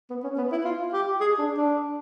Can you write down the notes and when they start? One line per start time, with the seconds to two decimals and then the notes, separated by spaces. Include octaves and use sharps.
0.10 B3
0.24 C#4
0.38 B3
0.52 E4
0.65 F4
0.93 G4
1.20 G#4
1.38 D4
1.57 D4